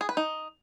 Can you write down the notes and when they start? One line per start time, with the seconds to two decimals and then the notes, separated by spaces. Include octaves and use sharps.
0.01 G#4
0.09 B4
0.17 D#4